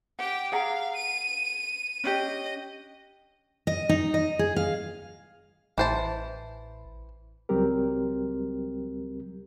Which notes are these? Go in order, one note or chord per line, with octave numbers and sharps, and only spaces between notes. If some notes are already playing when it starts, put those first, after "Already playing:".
G4 F#5 G5
G#4 F5 F#5 A#5
D#7
C#4 D4 G4 D#5
D#5
D#4
D#5
G#4
F5
A1 E3 C5 A5
C#2 F#3 G3 C4 G4 A#4